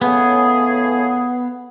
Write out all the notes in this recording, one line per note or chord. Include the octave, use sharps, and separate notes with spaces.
A2 C#3 B3 G#4